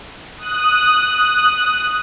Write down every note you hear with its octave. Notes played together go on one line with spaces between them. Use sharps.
D#6 F#6